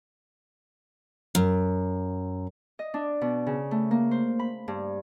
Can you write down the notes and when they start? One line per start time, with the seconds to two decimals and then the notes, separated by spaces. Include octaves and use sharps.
1.35 F#2
2.79 D#5
2.94 D4
3.21 B2
3.47 C#3
3.71 A3
3.91 A#3
4.11 C5
4.39 B5
4.68 G2